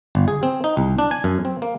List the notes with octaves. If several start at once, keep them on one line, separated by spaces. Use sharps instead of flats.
G1
G#4
C4
D#4
C2
D4
G#5
F#2
C4
A#3